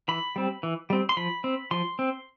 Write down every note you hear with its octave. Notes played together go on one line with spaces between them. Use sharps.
E3 B5
G3 C4
E3
G3 C4
C6
F3 B5
C4
F3 C6
C4